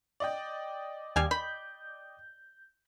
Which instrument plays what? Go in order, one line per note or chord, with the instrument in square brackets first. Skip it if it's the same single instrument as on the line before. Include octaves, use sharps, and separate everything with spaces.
[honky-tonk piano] D5 D#5 G5
[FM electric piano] D#2 [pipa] G3 F5 G#5
[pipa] B5 [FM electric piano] G6